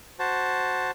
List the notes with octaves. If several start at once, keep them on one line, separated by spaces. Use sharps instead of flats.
F#4 C5 A5